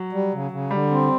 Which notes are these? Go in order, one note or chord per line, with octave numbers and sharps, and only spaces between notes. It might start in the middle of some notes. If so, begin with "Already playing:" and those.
Already playing: F#3
G3
C#3
C#3
D3 G3
C4